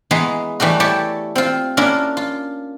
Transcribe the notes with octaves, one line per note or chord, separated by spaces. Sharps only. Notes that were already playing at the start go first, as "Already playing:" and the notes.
E3 G#3 B3 G#4 A#5 C6
E3 G3 A3 F#4
E4 G4 A4 C#5 D5
C4 F4
A#3 C#4 D4 E4 F4 A#4
F4